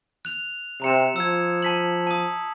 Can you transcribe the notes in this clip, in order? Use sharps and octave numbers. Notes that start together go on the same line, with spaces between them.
F#6 F7
C3 A#5 C#7 E7
F3 E6 G#6
A5 B6 F#7
A5 D#6